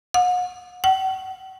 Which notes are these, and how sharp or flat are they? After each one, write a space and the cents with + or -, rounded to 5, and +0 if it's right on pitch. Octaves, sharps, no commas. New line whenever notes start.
F#5 -40
F#5 +45